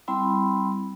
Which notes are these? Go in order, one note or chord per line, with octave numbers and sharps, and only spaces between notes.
G3 C4 E4 B5